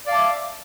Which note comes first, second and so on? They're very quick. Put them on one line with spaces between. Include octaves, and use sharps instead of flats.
D5 F5 A5 D6 E5